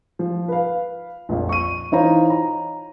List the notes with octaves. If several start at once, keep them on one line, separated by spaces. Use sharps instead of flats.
F3
B4 F5
A#1 F2
C#6 D#7
E3 D#4 F4 C5 C#5 A#5
A#5